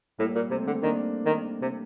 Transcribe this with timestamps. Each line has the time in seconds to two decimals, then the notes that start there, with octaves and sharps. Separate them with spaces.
0.19 A2 G3 A#3
0.35 A#2
0.50 C3 A3 C4
0.67 D3
0.82 D#3 A#3 D4
1.26 D#3
1.62 C3